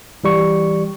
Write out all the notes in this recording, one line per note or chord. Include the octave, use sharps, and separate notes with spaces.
E3 G3 C#6